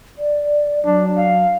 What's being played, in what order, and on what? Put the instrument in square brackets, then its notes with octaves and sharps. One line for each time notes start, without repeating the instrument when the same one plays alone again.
[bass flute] D5
[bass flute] F#3 [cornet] D4
[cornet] F5